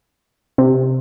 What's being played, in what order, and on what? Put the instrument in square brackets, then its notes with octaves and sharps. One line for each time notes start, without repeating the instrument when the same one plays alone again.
[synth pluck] C3